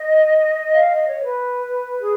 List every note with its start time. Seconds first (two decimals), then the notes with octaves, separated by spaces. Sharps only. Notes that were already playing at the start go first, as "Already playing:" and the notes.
Already playing: D#5
0.73 F5
0.90 D#5
1.07 C#5
1.24 B4
2.00 G#4